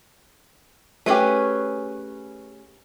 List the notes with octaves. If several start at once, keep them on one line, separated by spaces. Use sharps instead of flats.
A3 C#4 G4 G#4 B4